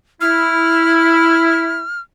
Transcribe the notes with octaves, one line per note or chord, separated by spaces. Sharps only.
E4 F6